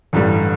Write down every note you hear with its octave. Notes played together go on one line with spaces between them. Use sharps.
A1 G2 D3 G3